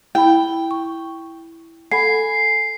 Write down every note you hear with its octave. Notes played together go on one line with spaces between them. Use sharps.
E4 G5 B5
C#6
A4 F#5 G#5 B5 C7